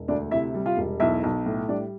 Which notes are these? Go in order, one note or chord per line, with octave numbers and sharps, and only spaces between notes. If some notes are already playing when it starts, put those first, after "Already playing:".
Already playing: E1
D2 D4 D5
C3 E4 E5
G3
F4 F5
E1
B1 E4 E5
B1
A2
G3 D4 D5